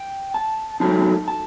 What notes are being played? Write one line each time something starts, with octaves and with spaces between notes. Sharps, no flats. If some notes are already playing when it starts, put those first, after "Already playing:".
Already playing: G5
A5
A2 F#3 A3 D#4 A5
A5